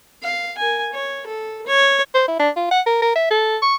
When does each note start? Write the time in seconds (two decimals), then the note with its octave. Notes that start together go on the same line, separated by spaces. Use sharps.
0.23 F5
0.58 A#4 G#5
0.93 C#5
1.27 A4
1.67 C#5
2.14 C5
2.28 E4
2.40 D4
2.56 F4
2.71 F#5
2.86 A#4
3.02 A#4
3.15 E5
3.31 A4
3.62 C#6